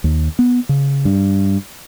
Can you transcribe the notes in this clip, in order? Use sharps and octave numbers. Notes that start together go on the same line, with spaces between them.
D#2
B3
C#3
G2